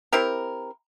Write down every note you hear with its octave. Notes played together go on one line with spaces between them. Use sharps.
C4 E4 G4 A#4